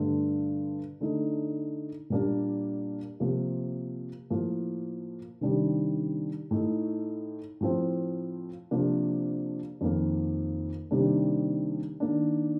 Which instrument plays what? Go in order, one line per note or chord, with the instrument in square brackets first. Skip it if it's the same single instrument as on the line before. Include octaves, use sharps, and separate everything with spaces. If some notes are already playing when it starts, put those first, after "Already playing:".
Already playing: [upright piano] G2 D3 A3
D3 A3 D#4
A#2 G3 A#3 D4
C3 F3 A#3
A2 F3 A#3
C3 D#3 G3 D4
A2 A3 D#4
A2 F3 C4
C3 F3 A#3 D4
F2 D#3 A#3
C3 D#3 G3 A#3 D4
D#3 A#3 D4